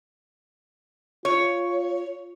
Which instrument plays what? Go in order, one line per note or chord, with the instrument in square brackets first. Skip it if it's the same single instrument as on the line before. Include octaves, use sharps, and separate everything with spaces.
[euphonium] F4 [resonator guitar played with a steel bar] C#5